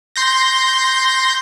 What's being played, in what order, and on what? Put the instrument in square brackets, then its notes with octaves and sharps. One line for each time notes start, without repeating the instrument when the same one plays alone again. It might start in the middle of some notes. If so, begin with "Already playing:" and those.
[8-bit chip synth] C6 G6 A#6